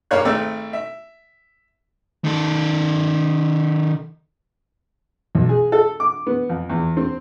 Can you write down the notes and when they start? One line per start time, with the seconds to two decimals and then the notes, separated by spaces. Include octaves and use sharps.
0.11 G2 A#3 C#5 F5 F#6
0.25 G#1 A3 C4 E6
0.73 E5
2.24 D#3 A4
5.35 B1
5.49 G#4
5.72 A4
6.00 D6
6.27 B3
6.50 F2
6.70 E2
6.97 C4